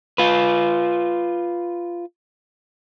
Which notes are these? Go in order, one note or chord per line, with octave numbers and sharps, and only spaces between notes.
F4 B4